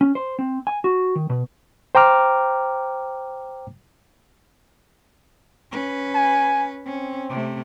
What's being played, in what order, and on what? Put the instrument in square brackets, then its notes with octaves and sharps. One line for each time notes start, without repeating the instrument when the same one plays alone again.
[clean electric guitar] C#4
C5
C4
G#5
F#4
D#3
B2
[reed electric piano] C5 G5 A#5 D6 F6
[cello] C#4 B4
[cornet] G#5
[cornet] C4 [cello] C#4
[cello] C3 A3